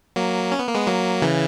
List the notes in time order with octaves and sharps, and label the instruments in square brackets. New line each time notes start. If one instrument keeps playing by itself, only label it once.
[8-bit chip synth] F#3 A#3
C#4
B3
A#3
G#3 B3
F#3 A#3
C#3 E3